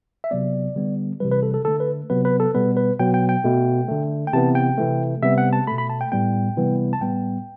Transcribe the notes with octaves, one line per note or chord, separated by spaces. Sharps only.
E5
C3 F#3 B3 D5
D3 G3 B3
C3 E3 G3 B4
B4
A4
A4
D3 A3 A4
B4
C3 F#3 B3 B4
B4
A4
B2 G3 B3 B4
B4
B2 F#3 B3 G5
G5
G5
B2 A3
D3 A3
G5
C3 E3 B3 A5
G5
C3 E3 A3
C3 G3 B3 E5
F#5
A5
B2 A3 B5
B5
A5
G5
A2 G3 B3 G5
C3 E3 G3 B3
A5
A2 G3 B3 G5